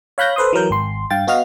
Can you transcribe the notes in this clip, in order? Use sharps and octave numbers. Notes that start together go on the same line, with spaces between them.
C#5 F5 B5 F#6 G6 A#6
A4 B4 C5 C6 D#6
E3 F#3 A#4 G6
G#1 C6
G2 F5 G5 A6
B3 F#4 D#5 F5 F6